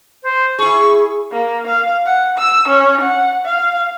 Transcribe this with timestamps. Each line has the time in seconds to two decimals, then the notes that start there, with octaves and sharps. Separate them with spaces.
0.23 C5
0.59 E4 G#4 C#6
1.32 A#3
1.68 F5
2.06 F#5
2.38 E6
2.69 C#4
3.02 F#5
3.46 F5